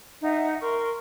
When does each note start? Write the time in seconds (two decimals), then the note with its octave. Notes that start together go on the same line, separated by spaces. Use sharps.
0.22 D#4 E5 F#5
0.61 A#4 C6 C#6